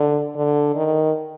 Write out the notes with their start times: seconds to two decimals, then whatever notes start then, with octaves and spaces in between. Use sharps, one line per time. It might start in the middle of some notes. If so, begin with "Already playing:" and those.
Already playing: D3
0.36 D3
0.76 D#3